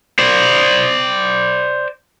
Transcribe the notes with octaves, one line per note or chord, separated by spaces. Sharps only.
C5 D5